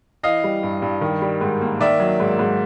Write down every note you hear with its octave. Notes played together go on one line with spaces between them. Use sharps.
E3 D#5 F5
G3
G2
G2
D#3
G3
G#2
A#3
D#3 D5 E5
F#3
G#2
G#2